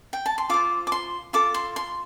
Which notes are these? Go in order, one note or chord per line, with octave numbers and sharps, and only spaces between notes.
G5
A5
C6
F4 A4 C5 D6
D6
C6
F4 A4 D6
C6
C6